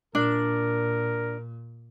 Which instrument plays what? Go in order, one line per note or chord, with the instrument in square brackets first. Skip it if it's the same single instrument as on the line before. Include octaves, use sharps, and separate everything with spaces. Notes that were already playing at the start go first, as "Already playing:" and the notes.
[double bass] A#2 [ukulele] D4 [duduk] A#4